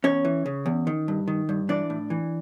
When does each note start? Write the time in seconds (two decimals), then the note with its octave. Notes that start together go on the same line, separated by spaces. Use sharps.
0.04 E2 C#4 C#5
0.25 E3
0.46 C#3
0.66 E2
0.87 D#3
1.08 G2
1.28 D#3
1.49 G2
1.69 E3 D4 D5
1.90 A2
2.10 E3